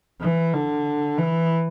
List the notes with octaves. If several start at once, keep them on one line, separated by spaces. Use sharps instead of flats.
E3
D3
E3